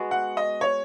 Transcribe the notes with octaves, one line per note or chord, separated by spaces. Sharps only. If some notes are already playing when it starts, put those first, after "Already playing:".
Already playing: G#3 B3 F#4
F#5
D#5
C#5